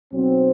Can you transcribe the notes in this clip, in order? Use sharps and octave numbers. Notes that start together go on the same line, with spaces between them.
B1 B2 F#3 C4